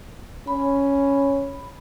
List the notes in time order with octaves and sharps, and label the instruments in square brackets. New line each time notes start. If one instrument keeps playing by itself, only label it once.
[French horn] C#4 [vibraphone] B5